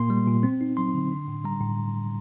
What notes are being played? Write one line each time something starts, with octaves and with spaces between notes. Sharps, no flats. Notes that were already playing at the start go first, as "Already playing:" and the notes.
Already playing: A#2 A#3 C6
G3
A#2
C4
D#4
F#3 C6
D3
D4
A2
G3 A#5
A2